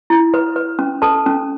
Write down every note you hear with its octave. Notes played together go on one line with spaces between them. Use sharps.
E4
B4
B4
C#4
A4 B4 A5
C#4